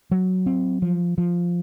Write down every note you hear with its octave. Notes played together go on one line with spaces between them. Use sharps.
F#3
C4
F3
F3